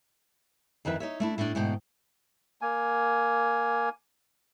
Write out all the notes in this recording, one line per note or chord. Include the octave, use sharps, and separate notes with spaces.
F2 D#3 E3 B4 E5
D#4 C#5 E5
A3 D4 E4
A2 D4
G#2 B2 D3 G5
A#3 G#5